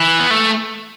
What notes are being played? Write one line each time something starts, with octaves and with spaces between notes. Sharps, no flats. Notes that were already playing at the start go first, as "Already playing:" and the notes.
Already playing: E3
B3
A3